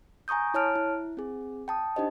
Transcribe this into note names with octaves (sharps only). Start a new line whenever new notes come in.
G#5 A#5 C#6 D#6 G6
E4 C#5 A5 F6 D7
E4
C4 G#4
G5 A5 D#6
D4 D#4 G4 C5 D#5